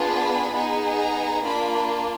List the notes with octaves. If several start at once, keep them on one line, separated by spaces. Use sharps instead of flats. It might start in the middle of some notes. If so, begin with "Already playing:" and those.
Already playing: B3 D4 F4 G#4
B5
B3 D#4 G#4
A#5
A#3 D4 F4 B5